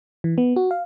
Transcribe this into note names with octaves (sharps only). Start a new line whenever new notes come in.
E3
B3
F#4
F5